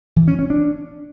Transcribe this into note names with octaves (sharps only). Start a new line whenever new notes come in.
E3
C#4
C#4
D4